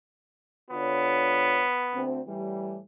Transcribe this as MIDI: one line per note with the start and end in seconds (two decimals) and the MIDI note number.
0.71 1.65 50
0.71 2.03 59
0.71 1.65 65
0.71 1.65 73
1.95 2.20 38
1.95 2.20 60
2.27 2.79 45
2.27 2.79 52
2.27 2.79 55